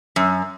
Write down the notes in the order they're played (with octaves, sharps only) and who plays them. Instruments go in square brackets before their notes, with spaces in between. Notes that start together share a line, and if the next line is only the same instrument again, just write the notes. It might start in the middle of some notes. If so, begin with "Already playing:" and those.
[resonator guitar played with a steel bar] F#2